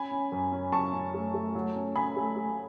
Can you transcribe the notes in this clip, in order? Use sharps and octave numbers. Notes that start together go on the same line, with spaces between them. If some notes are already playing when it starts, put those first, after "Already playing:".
Already playing: C#4 G#5 B5
C#4
F#2
C#4
F#2 A5 C#6
C#4
A3
A3
F#3
C#4
C#4 G#5 B5
A3
A3